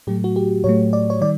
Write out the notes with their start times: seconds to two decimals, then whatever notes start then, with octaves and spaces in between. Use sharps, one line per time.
0.07 A2 F#3 A3 G4
0.24 F#4
0.36 G4
0.64 A2 F#3 A3 C#5
0.93 D5
1.10 C#5
1.21 D#3 G3 D5